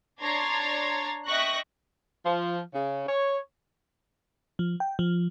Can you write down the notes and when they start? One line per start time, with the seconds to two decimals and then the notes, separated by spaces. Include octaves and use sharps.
0.21 D4 C#5 A#5 C6 G#6 A6
1.26 D#5 E5 G5 C#6 F#6 A#6
2.25 F3
2.74 C#3
3.07 C#5
4.59 F3
4.80 G5
4.99 F3